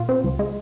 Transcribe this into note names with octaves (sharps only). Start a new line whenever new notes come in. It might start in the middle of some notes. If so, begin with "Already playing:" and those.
Already playing: A#2 F4
C4
C#2
G#3